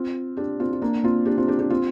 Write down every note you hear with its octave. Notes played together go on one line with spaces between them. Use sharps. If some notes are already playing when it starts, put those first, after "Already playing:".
Already playing: C4 F4
D4 G4
C4 F4
F4
A#3 D4
C4 F4
D4 G4
C4 F4
D4 G4
D4 G4
C4 F4